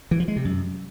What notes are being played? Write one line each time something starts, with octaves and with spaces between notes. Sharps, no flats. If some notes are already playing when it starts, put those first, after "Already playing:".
E3
F3
G#3
C3
F#2